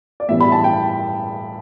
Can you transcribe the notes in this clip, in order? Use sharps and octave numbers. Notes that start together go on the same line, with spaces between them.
D5
A2 E3 G3 B3 E5
B5
A5
G5